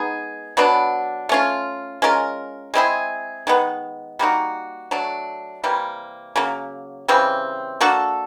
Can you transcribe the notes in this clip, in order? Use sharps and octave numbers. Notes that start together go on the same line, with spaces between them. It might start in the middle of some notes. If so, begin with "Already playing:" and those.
Already playing: G#3 B3 D#4 G#4
B2 F#3 B3 D4
A3 C#4 F4
G#3 C#4 F4 A#4
G#3 C4 E4 G#4
D#3 G#3 B3
G3 A#3 D#4 F#4
F#3 A3 D4
C3 E3 G3 A#3
C#3 F#3 A#3
C#3 E3 G3 C4
A#3 D4 F#4 A4